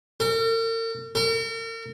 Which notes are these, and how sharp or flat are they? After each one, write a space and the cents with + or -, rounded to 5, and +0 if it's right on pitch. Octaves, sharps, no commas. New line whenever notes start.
A#4 -45
A#4 -40